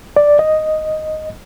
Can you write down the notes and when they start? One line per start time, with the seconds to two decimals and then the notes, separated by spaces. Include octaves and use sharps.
0.16 D5
0.39 D#5